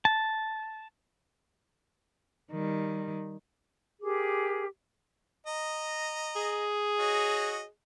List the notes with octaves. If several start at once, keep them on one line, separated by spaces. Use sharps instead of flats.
A5
D#3 G3
G4 G#4 A#4 D6
D#5 A#5
G#4
F#4 C#5 D#5